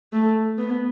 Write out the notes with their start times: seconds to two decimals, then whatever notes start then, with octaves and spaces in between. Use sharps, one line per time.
0.13 A3
0.58 B3